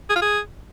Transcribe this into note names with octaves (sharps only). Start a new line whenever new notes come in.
G#4
F4
G#4